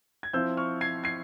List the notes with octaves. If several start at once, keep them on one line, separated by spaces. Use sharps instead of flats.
G#6
F3 C4 E4 E6 G6
C#6 F6
G#6 C7
G#6 C7